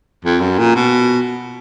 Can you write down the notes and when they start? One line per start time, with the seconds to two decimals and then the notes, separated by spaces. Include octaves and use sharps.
0.25 F2
0.41 F#2
0.59 A#2
0.76 B2